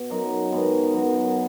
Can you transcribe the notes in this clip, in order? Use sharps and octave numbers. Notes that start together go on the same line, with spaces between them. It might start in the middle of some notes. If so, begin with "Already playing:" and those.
Already playing: B2
F#2 F#3 D#4 F#4
G#2 D#3 G#3 B3
F#2 F#3 B3 F#4